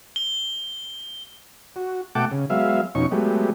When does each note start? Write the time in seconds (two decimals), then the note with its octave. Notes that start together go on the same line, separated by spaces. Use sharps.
0.16 G7
1.76 F#4
2.15 B2 A3 F#5 G5 A5 D6
2.31 C#3
2.50 F#3 G#3 B3 E5 F5
2.95 F2 B2 C#4 D#4 C#6
3.12 F#3 G#3 A3 B3 G4